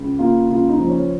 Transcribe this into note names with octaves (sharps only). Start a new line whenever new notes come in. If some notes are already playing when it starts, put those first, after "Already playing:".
Already playing: C#2
A#3 F4
C#2 F4
D#4
F3
C#4